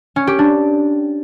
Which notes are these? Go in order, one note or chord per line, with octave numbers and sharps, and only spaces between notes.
C#4
G4
D4